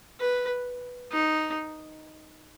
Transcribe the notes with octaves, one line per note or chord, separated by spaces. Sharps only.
B4
D#4